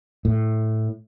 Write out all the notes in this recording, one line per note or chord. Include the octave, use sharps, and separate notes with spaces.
A2